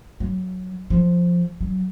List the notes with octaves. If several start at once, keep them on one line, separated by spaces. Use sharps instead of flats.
F#3
F3
F#3